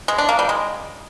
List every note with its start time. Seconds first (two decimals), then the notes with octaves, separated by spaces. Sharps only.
0.08 G#3
0.18 D4
0.29 A#3
0.39 G3
0.49 G#3